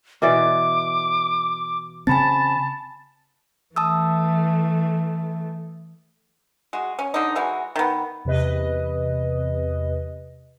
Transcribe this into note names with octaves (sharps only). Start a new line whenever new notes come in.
B2 E3 D5 D6
C#3 C4 F#5 G#5 A5 B5 A6
E3 A3 A5 D#6 E6
G#3 F#4
C#4
D3 D#4
E3 G#3 F#4
D#3 B3
E2 C3 B4 D#5